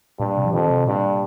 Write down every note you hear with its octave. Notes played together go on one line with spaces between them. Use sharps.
G2 A#2
C3
F3
F2 D#3
C3
G2 A#2